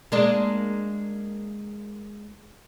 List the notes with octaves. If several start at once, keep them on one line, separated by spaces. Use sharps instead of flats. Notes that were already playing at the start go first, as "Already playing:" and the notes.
G#3 A#3 D4